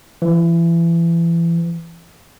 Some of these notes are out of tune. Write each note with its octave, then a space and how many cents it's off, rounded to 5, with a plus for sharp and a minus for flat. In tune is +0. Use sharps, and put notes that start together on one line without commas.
E3 +30